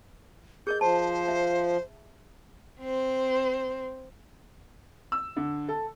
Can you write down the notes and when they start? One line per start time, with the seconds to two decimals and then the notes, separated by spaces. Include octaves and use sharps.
0.67 G#4 A#4 D#5 G6
0.81 F3 C5 A5
1.28 E5
2.80 C4 C5
5.12 E6
5.37 D3
5.69 A4